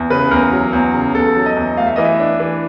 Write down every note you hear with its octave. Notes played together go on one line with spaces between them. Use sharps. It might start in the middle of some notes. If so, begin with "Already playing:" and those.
Already playing: E2
C#3 B4
E2 A#4
F#3
E2
C#3
E2 A4
F#3
D#5
E2
A3 F5
E5
E3 D#5
E5
D4
E3